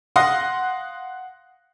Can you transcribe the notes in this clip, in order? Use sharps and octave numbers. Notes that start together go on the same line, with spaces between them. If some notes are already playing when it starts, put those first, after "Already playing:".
F5 F#5 C6 D#6 A#6